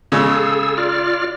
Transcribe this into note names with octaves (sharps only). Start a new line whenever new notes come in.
C#3 G#3 G#4 A4 E6
F4 D5 F6